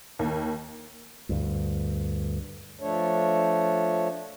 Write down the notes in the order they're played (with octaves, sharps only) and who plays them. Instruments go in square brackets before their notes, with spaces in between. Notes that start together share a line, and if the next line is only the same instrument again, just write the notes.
[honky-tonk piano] D#2
[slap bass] D2 G2
[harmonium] F3 A3 D4 C#5